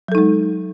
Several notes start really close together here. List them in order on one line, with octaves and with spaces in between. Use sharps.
F#3 A4 D#4 G#3